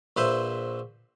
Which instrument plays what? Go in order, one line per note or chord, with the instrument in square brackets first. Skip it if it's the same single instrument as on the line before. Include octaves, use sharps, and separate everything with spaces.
[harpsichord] A#1 B4 C5 E5